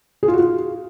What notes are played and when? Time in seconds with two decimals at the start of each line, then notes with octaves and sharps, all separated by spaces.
0.23 G#4
0.28 F4
0.34 F#4
0.39 F4